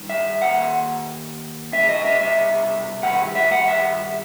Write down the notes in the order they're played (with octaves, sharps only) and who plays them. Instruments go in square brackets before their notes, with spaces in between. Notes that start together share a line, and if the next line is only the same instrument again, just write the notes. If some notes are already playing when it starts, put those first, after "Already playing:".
Already playing: [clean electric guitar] G2 D#3
E5
D#2 D#3 F#5
C2 B2 E5
D#5
E5
E5
G2 D#3 F#5
E5
F#5
E5